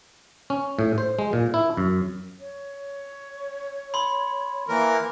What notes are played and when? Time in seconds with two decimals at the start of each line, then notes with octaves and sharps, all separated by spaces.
0.50 C#4
0.79 A2
0.98 C5
1.19 G#3
1.33 A#2
1.54 E4
1.77 F#2
2.40 C#5
3.94 B5 C6
4.68 E3 A#3 A#4